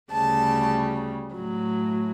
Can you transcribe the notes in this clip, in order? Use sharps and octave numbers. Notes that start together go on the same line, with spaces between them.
D2 C#3 G3 A5
A2 F#3